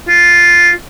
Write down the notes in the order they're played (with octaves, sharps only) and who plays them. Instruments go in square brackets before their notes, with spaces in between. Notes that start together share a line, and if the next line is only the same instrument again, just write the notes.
[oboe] F4